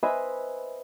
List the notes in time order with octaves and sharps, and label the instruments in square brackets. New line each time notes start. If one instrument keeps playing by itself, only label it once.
[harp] B4 C5 D#5 E5 G#5 B5